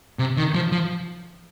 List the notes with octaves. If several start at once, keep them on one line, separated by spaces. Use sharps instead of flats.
C3
D#3
F3
F3